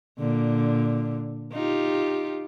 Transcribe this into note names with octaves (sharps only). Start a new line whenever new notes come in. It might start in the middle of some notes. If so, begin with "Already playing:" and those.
A#2 D3
D#4 F4 G4